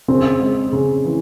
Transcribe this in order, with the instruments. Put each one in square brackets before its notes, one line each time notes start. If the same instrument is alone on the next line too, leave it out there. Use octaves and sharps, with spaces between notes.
[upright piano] C#3 [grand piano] C4
[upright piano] G#3
C#3
E3